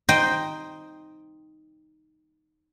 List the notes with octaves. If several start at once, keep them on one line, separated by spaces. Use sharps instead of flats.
D#4 C5 D#5 G5